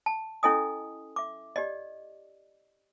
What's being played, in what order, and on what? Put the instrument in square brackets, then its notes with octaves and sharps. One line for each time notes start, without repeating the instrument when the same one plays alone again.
[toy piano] A5
C#4 E4 A4 D#5 G#5 D#6
E5 D6
G4 D5 D#5